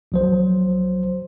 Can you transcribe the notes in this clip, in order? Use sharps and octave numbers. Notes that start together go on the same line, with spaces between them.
A#1 F#3 C5